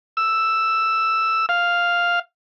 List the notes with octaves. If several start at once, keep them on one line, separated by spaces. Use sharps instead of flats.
E6
F5